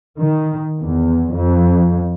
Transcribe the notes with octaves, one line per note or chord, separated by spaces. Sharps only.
D#3
E2
F2